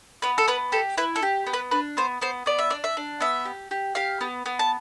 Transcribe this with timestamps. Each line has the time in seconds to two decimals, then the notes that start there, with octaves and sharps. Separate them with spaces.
0.22 B3 B4
0.38 A4
0.48 B3 B4
0.72 G4 A4
0.97 E4 B4
1.16 A4
1.23 G4
1.47 B3
1.53 B4
1.71 D4 B4
1.97 B3 C5
2.21 B3 C5
2.46 B3 D5
2.59 E5
2.70 D4 D5
2.84 E5
2.97 D4
3.21 B3 E5
3.45 G4
3.71 G4
3.95 G4 F5
4.21 B3
4.46 B3
4.59 A5